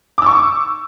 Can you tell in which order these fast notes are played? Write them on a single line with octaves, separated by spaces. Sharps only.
D6 E6 C#6